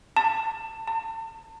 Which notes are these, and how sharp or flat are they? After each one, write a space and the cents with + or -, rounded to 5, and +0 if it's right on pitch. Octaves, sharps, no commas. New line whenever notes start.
A5 +25
A5 +35